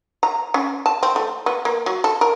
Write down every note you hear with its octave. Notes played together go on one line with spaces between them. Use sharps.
A#5
C#4
A5
C4
A3
B3
A#3
F#3
A4
A#4